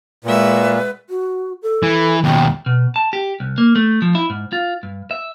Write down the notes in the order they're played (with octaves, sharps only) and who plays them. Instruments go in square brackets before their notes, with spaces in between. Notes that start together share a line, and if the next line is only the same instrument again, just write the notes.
[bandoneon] A#2 [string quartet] G#3 F#4 E5 [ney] B4
[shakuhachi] F#4
A4
[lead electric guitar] E3
[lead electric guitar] D#2 B2 [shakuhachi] G5
[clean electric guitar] B2
A5
G4
C2
A#3
A3
F3
E4
G#2
F4
G2
E5